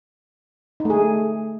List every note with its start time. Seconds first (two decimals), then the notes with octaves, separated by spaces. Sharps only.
0.80 D#4
0.85 A3
0.90 G#4